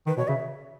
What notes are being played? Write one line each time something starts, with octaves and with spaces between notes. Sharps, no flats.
D#3 B4
B2 C#5
C#3 E5